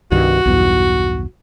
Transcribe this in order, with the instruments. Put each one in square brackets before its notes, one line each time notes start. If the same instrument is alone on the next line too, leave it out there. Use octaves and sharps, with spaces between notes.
[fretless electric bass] C2 G2 D#3 [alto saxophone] F#4
[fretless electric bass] B1 E2 G2